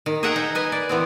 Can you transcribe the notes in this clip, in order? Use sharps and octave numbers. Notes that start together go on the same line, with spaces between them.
D#3
G#4 D#5 E5 F#5 G5 A#5
D#4
B4 D#5 G#5
D5
E3 B3 C4